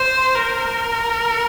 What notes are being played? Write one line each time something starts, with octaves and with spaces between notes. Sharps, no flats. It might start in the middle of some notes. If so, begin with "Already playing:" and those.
Already playing: C5
A#4